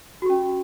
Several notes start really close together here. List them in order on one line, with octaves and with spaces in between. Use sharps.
F#4 G4 C#4